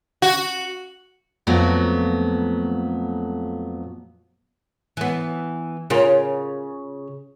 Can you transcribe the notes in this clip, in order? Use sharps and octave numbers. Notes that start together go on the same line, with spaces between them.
F#4
F2 A#2 F#3 A3 B3
E3 B3
C#3 F4 A#4